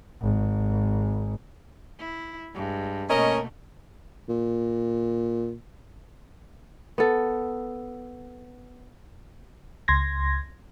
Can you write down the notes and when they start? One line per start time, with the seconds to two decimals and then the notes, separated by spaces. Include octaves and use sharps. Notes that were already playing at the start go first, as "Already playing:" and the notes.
0.22 G#1
1.99 E4
2.54 G2 G#3
3.09 B2 A3 A#3 C#4 A#4 D#5
4.29 A#2
6.98 B3 A4
9.88 C#2 C6 G#6 A#6